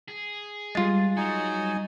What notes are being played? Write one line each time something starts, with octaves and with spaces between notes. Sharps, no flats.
G#4
G3 G#3 F4 A6
F#3 D#4 F#4 G#5